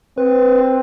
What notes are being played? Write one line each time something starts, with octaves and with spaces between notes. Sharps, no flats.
C4 B4